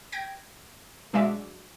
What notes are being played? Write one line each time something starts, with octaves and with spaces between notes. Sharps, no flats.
G5 G#6 A#6 D7
B1 G#3 D4 F#4 E5 D6